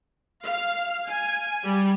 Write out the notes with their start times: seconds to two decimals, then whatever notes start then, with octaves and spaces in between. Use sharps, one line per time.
0.44 F5
1.08 G#5
1.65 G3